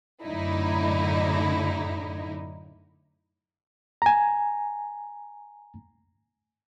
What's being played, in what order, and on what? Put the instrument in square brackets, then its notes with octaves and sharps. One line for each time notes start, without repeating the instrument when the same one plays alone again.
[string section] F#2 A2 D3 D#4 E4
[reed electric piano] G#5 A#5